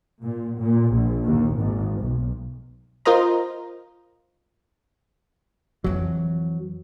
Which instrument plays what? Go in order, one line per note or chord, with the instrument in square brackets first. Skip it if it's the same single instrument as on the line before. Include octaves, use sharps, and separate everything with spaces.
[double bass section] A#2
A#2
A#1
D#2
G#1
B1
[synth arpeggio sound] F4 A#4 C5 D#5 A#5
[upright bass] F2 E3 [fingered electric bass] F#3